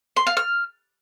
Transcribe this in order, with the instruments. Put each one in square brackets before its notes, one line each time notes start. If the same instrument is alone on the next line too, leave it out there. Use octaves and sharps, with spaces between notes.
[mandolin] C6
F5
F6